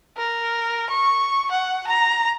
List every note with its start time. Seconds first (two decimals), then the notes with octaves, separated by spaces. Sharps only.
0.17 A#4
0.90 C#6
1.51 F#5
1.87 A#5